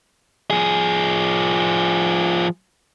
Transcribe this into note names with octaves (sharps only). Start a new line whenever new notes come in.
F3 G#4